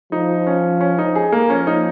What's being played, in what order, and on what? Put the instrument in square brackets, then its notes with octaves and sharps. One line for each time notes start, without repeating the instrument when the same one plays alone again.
[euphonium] F3 [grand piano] D#4
[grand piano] C#4
C#4
D#4
G#4
A#3
[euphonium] F3 [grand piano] C#4
[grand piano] D#4